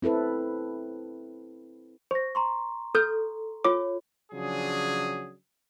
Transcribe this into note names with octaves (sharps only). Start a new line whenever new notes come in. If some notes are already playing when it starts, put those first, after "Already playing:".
C4 E4 A4 B4
C5 C#6 A#6
A#5 C6 C#6
A4 D#6 F6 G6
F4 C#5 D6
C#3 F3 F#3 D4 G#4